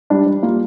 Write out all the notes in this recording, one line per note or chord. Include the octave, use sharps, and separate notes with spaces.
G3 D4
G3
A#3 F4